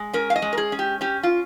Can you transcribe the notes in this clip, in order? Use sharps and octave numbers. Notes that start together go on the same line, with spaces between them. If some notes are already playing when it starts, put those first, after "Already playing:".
Already playing: G#3
C#4 A#4
F5
D#5
G#3
A#4
G#4
C#4
G4
C#4 G4
F4